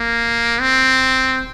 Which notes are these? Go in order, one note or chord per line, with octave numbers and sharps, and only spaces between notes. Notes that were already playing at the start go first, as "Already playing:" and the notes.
Already playing: A#3
C4